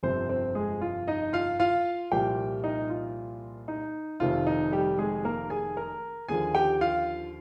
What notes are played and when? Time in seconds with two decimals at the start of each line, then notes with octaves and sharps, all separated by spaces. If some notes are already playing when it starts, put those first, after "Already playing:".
0.03 G1 F2 C3 C4 C5
0.29 C4 C5
0.55 G#3 G#4
0.81 F4
1.08 D#4 D#5
1.33 F4 F5
1.60 F4 F5
2.12 C2 A#2 F3 G4 G5
2.64 D#4 D#5
2.90 F4
3.68 D#4
4.20 F1 F2 C3 D#3 F4
4.47 D#4
4.72 G3 G4
4.98 G#3 G#4
5.25 A#3 A#4
5.50 G#4 G#5
5.77 A#4 A#5
6.28 D#2 D3 F3 G#4 G#5
6.55 G4 G5
6.81 F4 F5